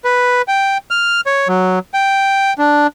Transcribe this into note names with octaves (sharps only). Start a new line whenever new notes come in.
B4
G5
F6
C#5
F#3
G5
D4